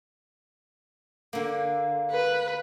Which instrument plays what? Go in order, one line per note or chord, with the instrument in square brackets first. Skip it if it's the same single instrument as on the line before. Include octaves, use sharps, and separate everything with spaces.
[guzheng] D3 A#3
[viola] B4